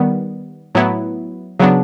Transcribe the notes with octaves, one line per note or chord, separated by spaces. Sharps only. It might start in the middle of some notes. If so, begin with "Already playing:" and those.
Already playing: D#3 G3 B3
A2 F#3 B3 E4
C#3 F#3 B3 D4